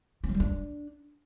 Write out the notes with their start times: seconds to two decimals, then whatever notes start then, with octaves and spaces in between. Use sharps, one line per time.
0.24 C#4
0.29 F#3
0.34 G3
0.40 D4